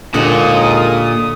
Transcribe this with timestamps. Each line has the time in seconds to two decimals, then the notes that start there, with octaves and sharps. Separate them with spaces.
0.14 D#2 A#2 D3 G#3 F#4 F#5 D#6